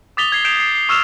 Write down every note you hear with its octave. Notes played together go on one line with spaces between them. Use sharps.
D6 D#6 A6 B6 F7 G7
G#6 C7 G7
G6 C7 D7 E7 F7
C7
C7
C#6 E6 F6 C7 E7 F7